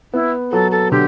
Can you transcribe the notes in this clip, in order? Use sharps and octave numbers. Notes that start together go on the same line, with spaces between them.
B3 E4
F#3 A4
A4
D3 G4